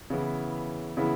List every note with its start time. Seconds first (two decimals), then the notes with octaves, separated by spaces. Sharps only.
0.10 C#3 E3 B3 E4
0.97 C#3 E3 B3 E4